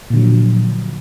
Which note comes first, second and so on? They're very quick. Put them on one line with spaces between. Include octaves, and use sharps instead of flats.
A#2 D3 F#3 F3